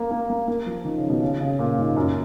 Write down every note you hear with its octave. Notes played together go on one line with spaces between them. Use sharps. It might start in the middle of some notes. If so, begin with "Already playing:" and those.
Already playing: A#3
A#3
A#3
A#3
F3
D#3
C#3
B2
C#3
C#3
A#2
G#2
F#2